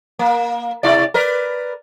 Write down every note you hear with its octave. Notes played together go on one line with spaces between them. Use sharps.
A#3
C3 E4 D5
A#4 B4 D5